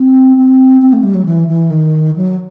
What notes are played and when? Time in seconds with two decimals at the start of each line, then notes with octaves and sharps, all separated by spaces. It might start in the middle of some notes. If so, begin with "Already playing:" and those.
Already playing: C4
0.37 C4
0.82 C4
0.93 A3
1.03 G3
1.14 F#3
1.25 E3
1.48 E3
1.70 D#3
2.16 F#3